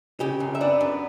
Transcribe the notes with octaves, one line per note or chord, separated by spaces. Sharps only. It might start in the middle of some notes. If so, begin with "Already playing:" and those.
C#3 G4 G5
F#2
E5
B3 D4 D5
F#2